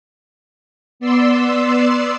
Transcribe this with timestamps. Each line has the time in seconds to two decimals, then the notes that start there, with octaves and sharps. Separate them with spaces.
1.00 B3 D5 C6 E6